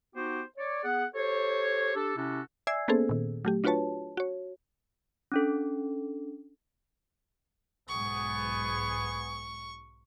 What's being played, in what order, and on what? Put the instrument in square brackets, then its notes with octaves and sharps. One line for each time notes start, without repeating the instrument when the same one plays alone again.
[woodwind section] B3 D#4 F#4 G4 C5
C#5 D5
B3 G#4 F#5
G4 A4 C5 C#5
D4 G4 A4
C3 C#4 E4 F#4 A4
[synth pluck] D5 E5 G#5 E6 G#6 C7
A#3 B3 C#4 G#4 A4 C5
A#2 D#3
F#3 A3 G4
D4 F4 F#4 B4 C#5 A5
F#4 C#5
[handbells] C#4 D4 A4
[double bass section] B1 G#2 [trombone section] B3 G#4 [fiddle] C#6